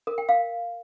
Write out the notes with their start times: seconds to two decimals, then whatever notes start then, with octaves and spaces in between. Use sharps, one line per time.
0.07 A#4
0.18 G5
0.29 F5